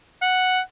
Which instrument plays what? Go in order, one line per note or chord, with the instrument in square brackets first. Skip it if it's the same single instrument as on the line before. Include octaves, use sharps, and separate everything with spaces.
[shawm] F#5